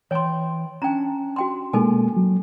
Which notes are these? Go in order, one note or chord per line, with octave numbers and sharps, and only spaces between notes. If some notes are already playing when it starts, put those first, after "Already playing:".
E3 C#5 G5 C6
C#4 D4 G5 A#5
F#4 G5 C6
B2 G#3 A#3 D#4 A4 G#5
F#3